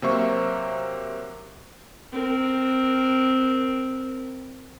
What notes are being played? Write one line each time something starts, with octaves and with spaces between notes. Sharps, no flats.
C3 F#3 A#3 C5 E5 C#6
C4 A#4